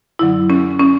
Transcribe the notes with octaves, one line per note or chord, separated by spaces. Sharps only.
F#2 D3 F#3 E4
C#4
C#4